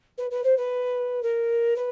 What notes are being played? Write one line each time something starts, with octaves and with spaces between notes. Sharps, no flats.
B4
B4
C5
B4
A#4
B4